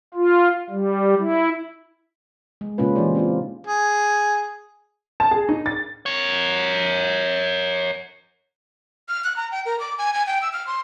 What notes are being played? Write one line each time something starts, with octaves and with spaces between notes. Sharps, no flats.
F4
G3
E4
G#3
A#2 C#3 G#3 C#4 F4 B4
E3 D#4 G4 C5 D5
C4 D4 F4
G#4
A5
G#4
D#4
A6
A#4 C#5
F6
F#6
A#5
G5
A#4
D6
G#5
G#5
G5
E6
F6
C6